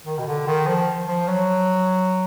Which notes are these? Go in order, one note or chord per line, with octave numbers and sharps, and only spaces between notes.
D#3
B2
D3
D#3
F3
F3
F#3